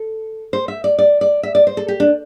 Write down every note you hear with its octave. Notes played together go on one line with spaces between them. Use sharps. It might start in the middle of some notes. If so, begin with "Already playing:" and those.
Already playing: A4
C5
E5
D5
D5
D5
E5
D5
C5
A4
G4
D4